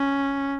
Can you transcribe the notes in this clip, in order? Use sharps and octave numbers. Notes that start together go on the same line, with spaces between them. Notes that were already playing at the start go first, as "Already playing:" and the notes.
Already playing: C#4